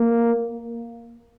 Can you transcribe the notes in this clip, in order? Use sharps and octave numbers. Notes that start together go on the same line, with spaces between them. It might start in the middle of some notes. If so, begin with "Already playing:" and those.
Already playing: A#3